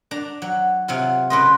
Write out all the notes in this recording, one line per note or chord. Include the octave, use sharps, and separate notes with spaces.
D4 A#5
F#3
C3 F#3 F4
C#3 B4 D#5 C6